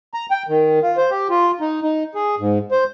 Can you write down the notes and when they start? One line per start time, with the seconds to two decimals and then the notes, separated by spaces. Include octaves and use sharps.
0.14 A#5
0.31 G5
0.48 D#3
0.82 F4
0.97 C5
1.11 G4
1.30 F4
1.60 D#4
1.82 D#4
2.15 G#4
2.39 G#2
2.72 C5